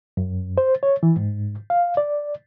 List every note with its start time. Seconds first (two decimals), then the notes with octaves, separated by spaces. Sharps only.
0.17 F#2
0.58 C5
0.83 C#5
1.03 E3
1.17 G#2
1.70 F5
1.97 D5